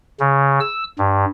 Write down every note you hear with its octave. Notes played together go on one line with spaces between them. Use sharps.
C#3
E6
G2